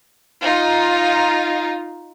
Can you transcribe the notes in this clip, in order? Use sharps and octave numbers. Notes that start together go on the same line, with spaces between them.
D#4 F4